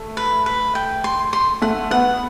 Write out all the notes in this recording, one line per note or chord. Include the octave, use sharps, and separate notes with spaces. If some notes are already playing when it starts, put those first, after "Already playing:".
Already playing: A3
B4
B4
G5
C6
C6
A3 F#5
B3 F#5